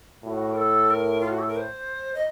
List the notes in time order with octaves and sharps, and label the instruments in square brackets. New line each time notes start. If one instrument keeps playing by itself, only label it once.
[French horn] A2 [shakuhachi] F#4
[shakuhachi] A#4
A4
A#4
F4
F#4
A4
A#4
C5
D#5